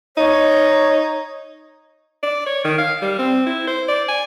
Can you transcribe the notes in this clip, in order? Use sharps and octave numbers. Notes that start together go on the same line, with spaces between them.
D#4 C#5
D5
C#5
D#3
F5
G3
C4
E4
C5
D5
G#5